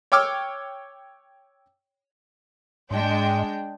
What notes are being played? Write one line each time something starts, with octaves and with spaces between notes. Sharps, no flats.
C#5 G5 D6 E6 F6
G#2 G#3 D4 D#5 G5 C6